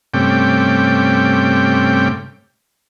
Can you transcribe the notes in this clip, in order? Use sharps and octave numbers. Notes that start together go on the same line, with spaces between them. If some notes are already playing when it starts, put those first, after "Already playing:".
G2 C3 A3 C#4 G5 D6